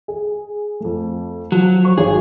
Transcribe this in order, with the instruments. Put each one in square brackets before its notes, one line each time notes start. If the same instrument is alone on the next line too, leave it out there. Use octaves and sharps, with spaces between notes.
[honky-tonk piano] G#4
F2 A3
[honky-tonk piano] F3 [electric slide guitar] F#3
[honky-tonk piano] C5 C#6
[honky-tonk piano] G#1 C#5 [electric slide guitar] G#4